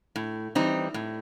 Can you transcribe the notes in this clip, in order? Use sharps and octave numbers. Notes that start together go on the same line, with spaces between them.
A2
E3 G3 C4 D#4
A2